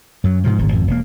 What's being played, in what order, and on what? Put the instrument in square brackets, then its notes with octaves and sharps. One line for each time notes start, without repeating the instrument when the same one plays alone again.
[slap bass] F#2 F#3
G#2 C3 F3
D1 G#1 A#2
G#1 F2
E1 A#3